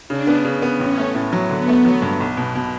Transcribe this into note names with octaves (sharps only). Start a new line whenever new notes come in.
C#3 D4
B3
C#3
B3
A1 C#4
A3
A2
F#3
D3 B3
A3
F#3
G2
B1
B2
B2